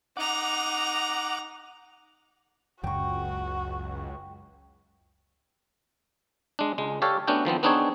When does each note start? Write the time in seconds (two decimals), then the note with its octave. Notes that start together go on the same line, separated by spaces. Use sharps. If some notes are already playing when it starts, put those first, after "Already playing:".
0.17 D#4 F#5 A#5 D6
2.83 F#1 C#2 F#2 F#3 F#4 G5 C#6
6.59 G#3 D4
6.78 C#2 G#3
7.02 G4 A4 C#5 D5 F5
7.27 A3 B3 C#4 D4 F#4 G5
7.45 D#3 F3 B3 C4
7.63 B3 C4 D4 D#4 G#4 C#5